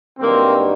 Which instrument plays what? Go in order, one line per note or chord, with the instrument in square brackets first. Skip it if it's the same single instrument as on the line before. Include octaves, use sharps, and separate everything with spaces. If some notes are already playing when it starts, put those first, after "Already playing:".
[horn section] G2 D#3 F#3 A#3 C4